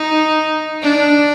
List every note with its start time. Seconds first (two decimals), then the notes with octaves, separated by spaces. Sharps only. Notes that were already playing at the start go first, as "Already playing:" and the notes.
Already playing: D#4
0.82 D4